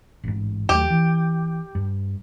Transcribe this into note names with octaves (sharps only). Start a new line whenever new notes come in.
A1 G#2
D#2 F#3 A3 G4
E3
G2